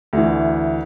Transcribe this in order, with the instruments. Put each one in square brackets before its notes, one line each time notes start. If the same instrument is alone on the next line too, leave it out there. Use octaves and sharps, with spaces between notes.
[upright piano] D2 E3